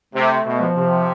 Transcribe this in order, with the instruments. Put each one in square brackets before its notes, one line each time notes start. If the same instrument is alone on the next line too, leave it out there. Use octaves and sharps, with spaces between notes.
[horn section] C3 [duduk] A3
[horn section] B2
[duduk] F3
[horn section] C3